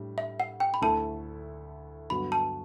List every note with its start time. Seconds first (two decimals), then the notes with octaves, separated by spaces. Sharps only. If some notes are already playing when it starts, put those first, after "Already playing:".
Already playing: A2 G3 D4
0.18 E5
0.40 F#5
0.60 G5
0.74 B5
0.81 D2 D3 A3 E4 A4 A5
2.10 G2 D3 F#3 B3 F#4 B5
2.32 A5